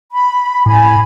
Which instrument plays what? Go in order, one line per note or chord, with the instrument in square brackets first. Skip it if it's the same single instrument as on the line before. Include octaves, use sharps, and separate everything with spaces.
[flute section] B5
[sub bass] A2 [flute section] G#5 B5